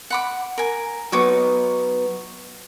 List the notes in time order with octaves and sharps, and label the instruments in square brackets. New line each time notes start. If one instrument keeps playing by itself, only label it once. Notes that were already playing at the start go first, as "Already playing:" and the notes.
[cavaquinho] F#5 B5 D6
A#4 G#5
[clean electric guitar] F#3 B3 [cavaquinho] D#4 C#5 D6